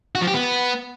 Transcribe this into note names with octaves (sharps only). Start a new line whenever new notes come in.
F#4
F3
G4
B3